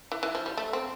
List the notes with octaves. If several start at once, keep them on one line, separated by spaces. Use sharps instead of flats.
E3
E3
F3
G3
A3
C4